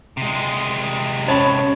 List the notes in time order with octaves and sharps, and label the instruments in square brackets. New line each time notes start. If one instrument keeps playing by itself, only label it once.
[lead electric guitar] C3 G#3
[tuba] C#4 [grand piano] C#5 A5 B5